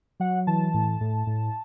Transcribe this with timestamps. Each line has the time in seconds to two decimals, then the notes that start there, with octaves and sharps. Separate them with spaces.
0.20 F#3 F#5
0.47 E3 A5
0.74 A2
1.01 A2
1.27 A2